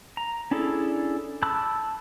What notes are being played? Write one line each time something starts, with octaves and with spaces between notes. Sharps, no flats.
A#5
C#4 D4 E4 G#4 A4
A5 B5 D6 E6 F#6